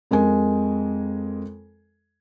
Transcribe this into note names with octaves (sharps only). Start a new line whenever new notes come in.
F2 G#3 A#4 G#5